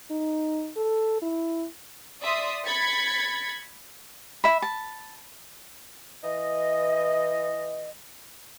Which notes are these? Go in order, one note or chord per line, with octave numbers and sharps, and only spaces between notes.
D#4
A4
E4
D5 E5 C6 D#6
B5 G#6 A6 B6 C#7
E5 B5
A5
E3 D#5